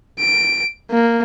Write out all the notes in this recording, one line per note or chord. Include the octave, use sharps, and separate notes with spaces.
D7
A#3